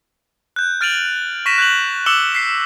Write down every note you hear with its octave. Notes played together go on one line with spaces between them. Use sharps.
F#6 G6
F6 A6 D7 D#7 F7 F#7
C#6 A#6 B6 D#7 E7
F#6 G6 F7 F#7
D6 E6 C#7 E7 F#7 G7
B6 C7